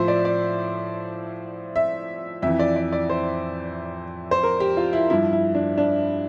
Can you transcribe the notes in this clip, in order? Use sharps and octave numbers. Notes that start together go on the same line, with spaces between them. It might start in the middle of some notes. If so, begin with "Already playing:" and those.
Already playing: A2 F3 C5 E5
D5
D5
E5
F2 E3 E5
D5
D5
D5
C5
C5
A#4
G4
F4
E4
G2 F3 E4
E4
D4
D4